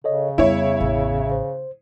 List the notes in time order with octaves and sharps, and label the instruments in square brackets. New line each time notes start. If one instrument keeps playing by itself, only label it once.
[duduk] C#3 [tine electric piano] A4 C#5 D#5
[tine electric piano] F2 B3 [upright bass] G3 [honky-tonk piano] E4 C#5
[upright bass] A1
[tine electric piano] C5